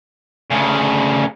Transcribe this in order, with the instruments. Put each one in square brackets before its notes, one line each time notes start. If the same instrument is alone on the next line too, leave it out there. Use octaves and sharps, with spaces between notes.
[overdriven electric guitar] D2 C#3